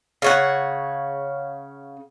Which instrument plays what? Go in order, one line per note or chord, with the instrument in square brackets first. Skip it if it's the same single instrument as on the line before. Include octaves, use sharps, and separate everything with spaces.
[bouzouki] C#3 C#5 F#5